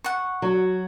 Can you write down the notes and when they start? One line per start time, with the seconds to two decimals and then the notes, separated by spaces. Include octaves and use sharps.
0.04 F#5 C#6
0.42 F#3 F#4